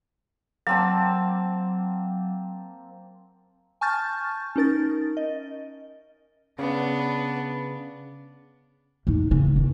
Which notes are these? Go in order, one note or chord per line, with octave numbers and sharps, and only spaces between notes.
F#3 A#3 C4 A5
G#5 A5 C#6 F6 G6 A6
C#4 D#4 A#4 A6
D#5
C#3 B3 D4
A2 D#4
C#3 C4
D#3 D4